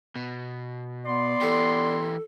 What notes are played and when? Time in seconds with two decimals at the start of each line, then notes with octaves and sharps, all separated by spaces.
0.16 B2
1.06 B3 D5 C6
1.41 E3 G4 A4